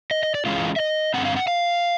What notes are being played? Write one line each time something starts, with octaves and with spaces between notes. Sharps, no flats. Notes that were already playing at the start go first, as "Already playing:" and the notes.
D#5
D#5
D5
E3 G#3 C#4 F4
E5
D#5
G2 D3 G3 C4 F#5
F5
F#5
F5